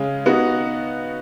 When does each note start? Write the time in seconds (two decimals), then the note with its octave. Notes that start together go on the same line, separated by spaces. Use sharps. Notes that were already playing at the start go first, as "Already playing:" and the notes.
Already playing: C#3 G#3 C#4
0.26 B3 D#4 F#4